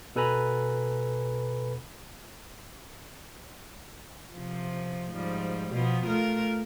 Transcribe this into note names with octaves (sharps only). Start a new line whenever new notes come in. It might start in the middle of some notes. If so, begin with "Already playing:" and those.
B2 A4 B4 G#5 A#5 B5
C3 F3
G#2 F3 G3
B2 F3 B3
A3 F4 A#4